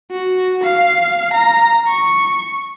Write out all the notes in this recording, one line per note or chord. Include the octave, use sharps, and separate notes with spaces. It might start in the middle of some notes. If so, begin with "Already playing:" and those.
F#4
F5
A#5
C#6